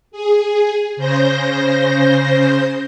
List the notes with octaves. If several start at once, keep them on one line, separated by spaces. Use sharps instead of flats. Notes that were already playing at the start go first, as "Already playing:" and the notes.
G#4
C#3 C5 G6 A#6